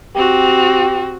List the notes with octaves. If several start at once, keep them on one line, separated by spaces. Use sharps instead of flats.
C4 F#4 G4